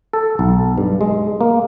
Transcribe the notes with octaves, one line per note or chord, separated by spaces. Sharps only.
A4
B1
G2
G#3
A#3